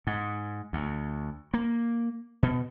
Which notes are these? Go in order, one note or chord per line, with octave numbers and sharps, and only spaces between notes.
G#2
D2
A#3
B2